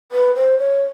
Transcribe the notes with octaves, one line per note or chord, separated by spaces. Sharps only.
B4
C5
C#5